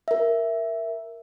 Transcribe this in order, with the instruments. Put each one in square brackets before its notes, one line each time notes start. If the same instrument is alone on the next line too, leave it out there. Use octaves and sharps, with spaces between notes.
[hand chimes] A#4 E5